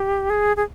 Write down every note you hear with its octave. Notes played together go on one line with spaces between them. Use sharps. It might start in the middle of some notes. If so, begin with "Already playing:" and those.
Already playing: G4
G#4
G#4